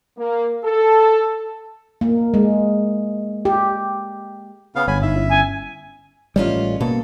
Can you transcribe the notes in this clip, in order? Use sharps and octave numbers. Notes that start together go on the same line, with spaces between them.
A#3
A4
A#3
G#3
G4
C#3 B3 F5
G1 C#5 G#5 B5 G#6
G#2 D#4 E5
C#4 E4
G#5
A1 G3 G#3 C#4 F4
B2 A#3 A4